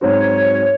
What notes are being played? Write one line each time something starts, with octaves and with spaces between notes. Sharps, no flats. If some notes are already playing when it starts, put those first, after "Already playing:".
G#2 F#3 C4 D#4 F#4 C#5